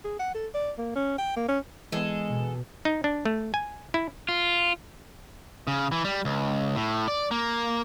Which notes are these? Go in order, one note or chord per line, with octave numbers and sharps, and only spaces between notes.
G#4
F#5
A4
D5
A#3
C#4
G5
A#3
C#4
E3 G#3 B3 G#4 A4
B2
D#4
D4
A3
G#5
E4
F4
C#3
E3
G3
C#2
A2
D5
A#3